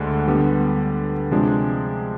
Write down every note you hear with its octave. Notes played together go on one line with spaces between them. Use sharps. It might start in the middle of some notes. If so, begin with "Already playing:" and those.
Already playing: D2 D3 G#3
D3 G3 B3
C3 F3 G#3 D4